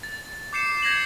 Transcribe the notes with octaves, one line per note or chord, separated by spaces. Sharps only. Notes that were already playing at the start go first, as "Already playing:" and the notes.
A6
D6 G6 C7 C#7 E7
G6 G#6 A#6 C7 F#7